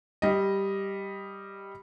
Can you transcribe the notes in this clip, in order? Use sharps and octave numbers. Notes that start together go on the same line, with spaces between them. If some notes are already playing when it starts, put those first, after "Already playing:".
G3 D#5